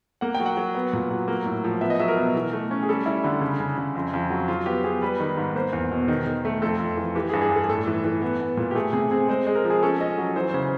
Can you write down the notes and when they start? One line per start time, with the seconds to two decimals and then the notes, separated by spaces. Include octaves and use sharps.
0.21 A#3 F#5
0.35 G5
0.40 F#3
0.46 F#5
0.57 F#3
0.75 B3
0.93 A#2
1.11 F#3
1.28 A#3
1.46 A2
1.64 F3
1.81 B3 E5
1.90 D#5
2.00 F#3 E5
2.08 A#4
2.17 B2
2.36 E3
2.52 A3
2.71 C#4
2.83 G#4
2.89 G3 A4
3.06 G3 E4
3.24 D3 E4
3.41 C#3
3.60 C#3
3.78 C#3
3.95 F2
4.13 F2
4.30 F#3
4.48 F#3 F4
4.66 B3 G4
4.84 B3 G#4
5.02 G3 B4
5.20 D#3
5.37 G#2
5.55 A#3 C5
5.73 E2
5.91 B2
6.08 D#3
6.26 D#3
6.45 A3
6.62 F2 A4
6.79 F2
6.97 E3
7.15 E3 G4
7.29 G#4
7.33 G2
7.42 G#4
7.51 G2 A4
7.64 G#4
7.69 A2 A4
7.87 E3
8.04 E3
8.22 B3
8.40 B3
8.57 A#2
8.71 G4
8.75 A3 G#4
8.93 C3 G#4
9.11 C4 G#4
9.28 G#3 C5
9.47 G#3
9.55 A#4
9.64 F3
9.70 G#4
9.83 C#4 A4
10.00 C#4 D#5
10.18 F#3
10.36 E3 C5
10.49 C5
10.54 C#3
10.62 C5